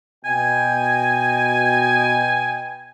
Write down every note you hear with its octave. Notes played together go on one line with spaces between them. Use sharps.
B2 D#5 G5 G#5